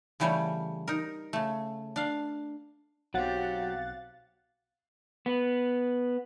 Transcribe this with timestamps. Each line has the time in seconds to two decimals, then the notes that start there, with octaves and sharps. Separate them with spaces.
0.20 C#3 E3 G3 A3 C#5
0.88 D#4 A#4
1.33 C#3 A3
1.96 D4 F5
3.14 B1 F#3 C4 F#4 G4 F5 F#5 A6
5.26 B3